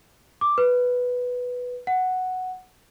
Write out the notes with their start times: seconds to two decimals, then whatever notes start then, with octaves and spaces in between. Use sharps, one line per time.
0.41 D6
0.58 B4
1.87 F#5